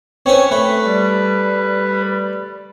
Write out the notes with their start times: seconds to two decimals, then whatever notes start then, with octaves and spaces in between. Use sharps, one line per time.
0.26 C4 C#4 B4 C#5
0.51 A3 B4
0.86 G3